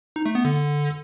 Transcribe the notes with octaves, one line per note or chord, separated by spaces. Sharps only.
D#4
A3
B3
D3